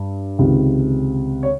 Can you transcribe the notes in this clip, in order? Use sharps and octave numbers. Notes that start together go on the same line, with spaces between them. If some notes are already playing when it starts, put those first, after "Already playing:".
Already playing: G2
C#2 C3 D#3
C#5